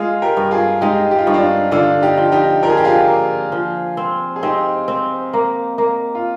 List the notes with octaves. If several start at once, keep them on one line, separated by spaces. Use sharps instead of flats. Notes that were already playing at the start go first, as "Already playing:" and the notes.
Already playing: G#3 F4 G#4
G4 A#4
G2
F4 G#4
G#3 D#4 G4
G4
F4
G2 D#4
D4 F4
D3 D4 F4
D#4 G4
F3
D#4 G4
F3 A#4
G#4
G4
F4 G#4
A#3
F3
C4
G#4
C4 D#4 G4
C4
A#3
A#3
F4